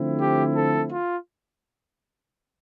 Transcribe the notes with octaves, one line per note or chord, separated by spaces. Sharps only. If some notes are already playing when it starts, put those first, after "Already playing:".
Already playing: D3 F3 A3 C4 E4
G4
A4
F4